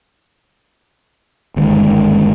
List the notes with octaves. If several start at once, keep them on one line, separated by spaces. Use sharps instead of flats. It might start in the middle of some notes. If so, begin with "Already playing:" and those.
G1 D#2 G#2